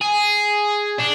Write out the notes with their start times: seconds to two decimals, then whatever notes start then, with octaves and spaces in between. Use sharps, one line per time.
0.01 G#4
1.00 D4